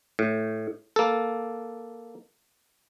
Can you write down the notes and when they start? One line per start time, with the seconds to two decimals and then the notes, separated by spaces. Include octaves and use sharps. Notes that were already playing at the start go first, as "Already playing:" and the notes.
0.19 A2
0.96 A#3 A4